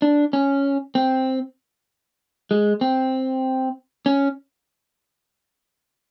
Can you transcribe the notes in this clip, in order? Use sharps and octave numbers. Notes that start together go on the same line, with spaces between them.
D4
C#4
C4
G#3
C4
C#4